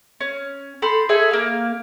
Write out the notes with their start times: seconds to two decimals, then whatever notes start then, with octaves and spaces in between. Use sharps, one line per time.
0.21 C#4
0.82 A4 B5 C6 G6
1.09 G#4 A4 E5 G#5
1.31 A#3 F5